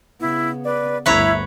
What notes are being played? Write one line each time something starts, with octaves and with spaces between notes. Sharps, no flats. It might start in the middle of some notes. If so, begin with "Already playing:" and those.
C#3 B3 E4
B4 D5
G1 D2 E4 B4 C#5 E5 A#5